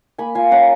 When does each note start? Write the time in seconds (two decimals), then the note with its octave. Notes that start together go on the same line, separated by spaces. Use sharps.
0.18 A#3 G#5 B5
0.35 F4 F5 G#5
0.51 C#4 F#5 A#5